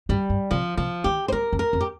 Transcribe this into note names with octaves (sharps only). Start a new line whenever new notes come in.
G2 G3
G2
C3 F3
C3 F3
D#3 G4
C5
G2 A#4
F2
A#4
F2
G4